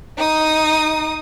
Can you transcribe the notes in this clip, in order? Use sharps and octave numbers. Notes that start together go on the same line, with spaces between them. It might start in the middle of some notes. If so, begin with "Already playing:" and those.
D#4 D#6